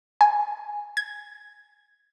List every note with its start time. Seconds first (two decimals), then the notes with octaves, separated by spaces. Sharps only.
0.21 G#5
0.97 G#6